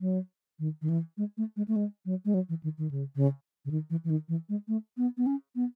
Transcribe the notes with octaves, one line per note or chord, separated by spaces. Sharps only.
F#3
D#3
D#3
E3
G#3
A3
G#3
A3
G#3
F#3
G#3
F#3
E3
D#3
D#3
C#3
C#3
C#3
D#3
E3
E3
D#3
E3
G#3
A3
B3
B3
C#4
B3